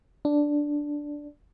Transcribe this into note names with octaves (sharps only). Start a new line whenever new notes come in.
D4